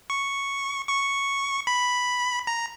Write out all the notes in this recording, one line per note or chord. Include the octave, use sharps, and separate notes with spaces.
C#6
C#6
B5
A#5